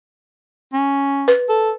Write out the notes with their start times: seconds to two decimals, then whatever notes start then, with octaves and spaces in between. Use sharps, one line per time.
0.73 C#4
1.28 B4
1.49 A4